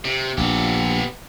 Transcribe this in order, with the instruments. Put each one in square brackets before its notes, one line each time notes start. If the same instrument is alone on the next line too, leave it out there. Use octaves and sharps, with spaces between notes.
[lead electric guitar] C3
[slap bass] A#1 [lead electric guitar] B3 G4